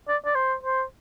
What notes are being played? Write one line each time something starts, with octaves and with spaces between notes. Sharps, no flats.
D5
D5
C5
C5